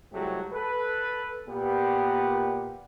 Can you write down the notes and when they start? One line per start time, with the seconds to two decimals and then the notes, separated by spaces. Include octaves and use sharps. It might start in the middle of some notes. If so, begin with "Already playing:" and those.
0.12 C2 F2 F#3 G#3 A3 G4
0.53 A4 B4
1.47 A#2 B3 G4